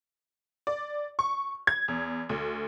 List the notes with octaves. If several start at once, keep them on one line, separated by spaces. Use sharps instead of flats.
D5
C#6
G#6
E2
D2